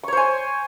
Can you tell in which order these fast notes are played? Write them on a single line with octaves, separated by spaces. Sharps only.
C#6 C#5 C5 G#5